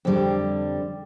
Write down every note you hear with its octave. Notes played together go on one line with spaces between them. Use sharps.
F2 D3 G3